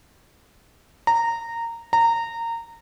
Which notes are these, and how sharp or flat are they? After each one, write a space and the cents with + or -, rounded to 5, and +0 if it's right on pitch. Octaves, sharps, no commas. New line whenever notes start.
A#5 -15
A#5 -20